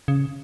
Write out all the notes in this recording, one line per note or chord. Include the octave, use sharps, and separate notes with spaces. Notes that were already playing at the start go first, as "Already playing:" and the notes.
C#3